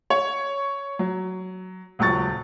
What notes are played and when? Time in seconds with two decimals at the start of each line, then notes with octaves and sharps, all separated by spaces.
0.10 C#5
0.99 F#3
1.99 D#1 C#2 F#3 C#6 A6